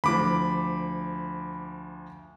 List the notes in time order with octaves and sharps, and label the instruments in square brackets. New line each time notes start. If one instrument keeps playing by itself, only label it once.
[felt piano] D2 F3 [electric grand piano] B5 D6